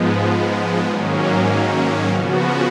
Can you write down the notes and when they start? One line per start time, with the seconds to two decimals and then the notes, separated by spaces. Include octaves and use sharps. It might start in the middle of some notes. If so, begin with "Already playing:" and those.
Already playing: G#2 F3 G#3 B3
0.88 G#2 D#3 F#3 A#3 C#4
2.08 C#3 F3 B3 F#4